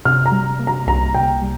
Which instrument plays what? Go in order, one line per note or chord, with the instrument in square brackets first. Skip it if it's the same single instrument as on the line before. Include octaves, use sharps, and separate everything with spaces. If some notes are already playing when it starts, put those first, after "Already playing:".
[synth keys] C3 [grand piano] F6
[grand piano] A#5
[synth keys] G3
A#3
[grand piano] A#5
[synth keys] C2 [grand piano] A#5
[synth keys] C3 [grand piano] G5
[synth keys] G3